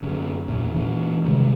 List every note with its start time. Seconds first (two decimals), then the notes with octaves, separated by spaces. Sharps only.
0.02 F#2 D3
0.48 E2 A#2
0.74 A#2 E3
1.24 C3 D#3 G3 G#3